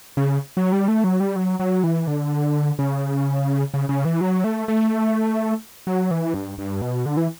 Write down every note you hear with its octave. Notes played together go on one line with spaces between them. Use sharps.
C#3
F#3
G3
A3
F#3
G3
F#3
F#3
E3
D3
C#3
C#3
C#3
E3
F#3
A3
A3
F#3
E3
G2
G2
B2
D3
E3